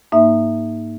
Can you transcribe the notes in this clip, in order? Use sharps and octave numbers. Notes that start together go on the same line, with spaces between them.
G#2 A#3 D#4 E5